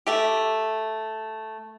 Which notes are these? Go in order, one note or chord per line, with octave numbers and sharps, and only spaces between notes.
A3 G4